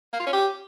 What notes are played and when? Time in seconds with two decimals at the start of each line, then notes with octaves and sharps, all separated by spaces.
0.13 A#3
0.20 F4
0.26 C#4
0.33 G4